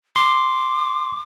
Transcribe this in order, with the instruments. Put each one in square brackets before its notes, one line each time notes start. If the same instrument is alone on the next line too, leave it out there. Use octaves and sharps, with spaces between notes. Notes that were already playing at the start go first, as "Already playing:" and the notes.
[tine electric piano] C6 [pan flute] D6